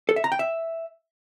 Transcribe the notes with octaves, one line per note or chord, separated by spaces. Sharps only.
A4
E5
A#5
G5
E5